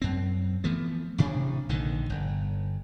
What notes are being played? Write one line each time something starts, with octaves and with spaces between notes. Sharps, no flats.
F#2 C4
E3 F3 A3 B3
A1 C3 D4
A#1 D3 D#3
G1